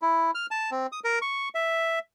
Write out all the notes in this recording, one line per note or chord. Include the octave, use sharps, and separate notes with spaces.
E4
F6
A5
C4
D#6
A#4
C#6
E5